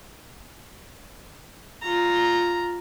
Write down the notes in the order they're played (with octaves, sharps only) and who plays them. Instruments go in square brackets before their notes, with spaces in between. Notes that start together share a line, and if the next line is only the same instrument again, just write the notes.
[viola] F4 A#5